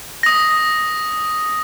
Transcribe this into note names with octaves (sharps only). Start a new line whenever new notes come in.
D#6 A#6